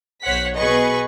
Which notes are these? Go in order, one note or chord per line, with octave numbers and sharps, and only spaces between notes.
B1 C5 C#5 F#5 B6
B2 G#4 B4 D#5 C#6